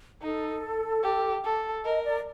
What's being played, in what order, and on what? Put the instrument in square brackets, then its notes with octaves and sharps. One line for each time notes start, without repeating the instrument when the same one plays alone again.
[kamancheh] D#4 [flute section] A4
[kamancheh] G4
A4
[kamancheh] A#4 [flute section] D#5
[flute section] D5